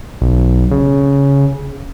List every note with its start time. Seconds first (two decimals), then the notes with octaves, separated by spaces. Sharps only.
0.21 B1
0.71 C#3